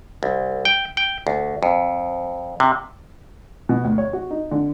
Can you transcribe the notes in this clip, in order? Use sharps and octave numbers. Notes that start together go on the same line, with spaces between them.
C2
G5
G5
D2
F2
C3
B2
D2
C#5
F#4
D#4
D3